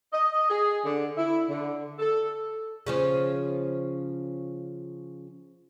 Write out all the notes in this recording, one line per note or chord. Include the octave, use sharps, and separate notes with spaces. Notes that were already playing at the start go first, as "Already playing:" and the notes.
D#5
G#4
D3
E4
D3
A4
C#3 F3 C#4